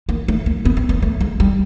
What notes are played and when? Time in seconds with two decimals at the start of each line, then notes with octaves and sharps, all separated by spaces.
0.09 A#3
0.28 A3
0.46 A#3
0.65 B3
0.77 C4
0.89 B3
1.02 A3
1.20 G#3
1.40 G3